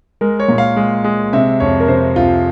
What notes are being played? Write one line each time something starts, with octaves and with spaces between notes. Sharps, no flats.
G#3 A#4
C#5
A#2
F5
G#3
G#3
C3 E5
F2 C#5
A#4
C3 C5
F2 F4